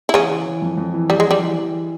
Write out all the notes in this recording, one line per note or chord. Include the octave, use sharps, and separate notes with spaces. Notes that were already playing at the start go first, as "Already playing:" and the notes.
E4
C#3 E3 C#4
E3
E3
F2
F2
E3
F2 G3
G#3
E3 G3
E3
E3